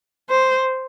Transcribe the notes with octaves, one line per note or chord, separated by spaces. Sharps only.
C5